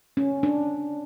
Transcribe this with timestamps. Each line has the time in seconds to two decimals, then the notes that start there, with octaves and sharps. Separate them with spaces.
0.17 C#4
0.43 D4